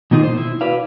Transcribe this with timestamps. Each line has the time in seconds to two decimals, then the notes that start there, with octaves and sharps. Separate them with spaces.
0.11 B2 D#3 A#3 D#4 F4 G#4
0.23 C5
0.37 E4
0.61 F#4 B4 D5 F5